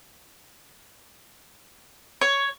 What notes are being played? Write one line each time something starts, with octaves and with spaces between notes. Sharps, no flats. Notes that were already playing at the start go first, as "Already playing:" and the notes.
C#5